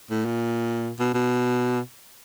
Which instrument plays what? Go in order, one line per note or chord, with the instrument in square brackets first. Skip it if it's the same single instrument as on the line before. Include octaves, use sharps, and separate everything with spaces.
[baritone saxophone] A2
A#2
B2
B2